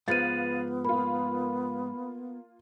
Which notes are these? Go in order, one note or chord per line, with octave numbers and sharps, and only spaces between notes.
G#2 F3 B3 B4 F5 A6 D#7
A#3 F4 B5